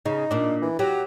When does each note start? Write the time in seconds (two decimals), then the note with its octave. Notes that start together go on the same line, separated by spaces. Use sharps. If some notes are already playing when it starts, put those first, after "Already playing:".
0.06 C#3 D#4
0.31 A#2 D4
0.62 E3
0.79 F#3 G4